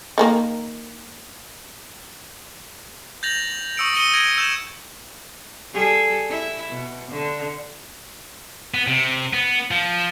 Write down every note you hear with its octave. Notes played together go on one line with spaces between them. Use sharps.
D#3 F3 A#3
G6 A6 A#6 F7 F#7
C#6 D#6 E6 C#7 D7
D#6 A#6 C#7 D#7 G7
G#6 A#6 D7 G7
E6 G6 G#6 E7
G3 G#4 A4
E4
B2
D3
B3
C3
B3
F3